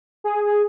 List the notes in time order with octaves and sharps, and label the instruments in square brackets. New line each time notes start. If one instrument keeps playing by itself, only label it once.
[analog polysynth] G#4